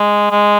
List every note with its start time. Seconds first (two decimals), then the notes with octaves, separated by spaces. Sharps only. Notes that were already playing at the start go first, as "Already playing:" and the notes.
Already playing: G#3
0.31 G#3